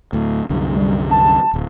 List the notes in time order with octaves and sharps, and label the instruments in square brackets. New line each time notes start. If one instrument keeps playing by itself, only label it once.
[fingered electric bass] D2 A2
C2 F#2 D3
[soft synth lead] G3
A5
[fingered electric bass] D1